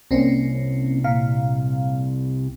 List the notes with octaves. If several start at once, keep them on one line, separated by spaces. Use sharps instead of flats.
C2 A#3 C4 C#4
A#2 F5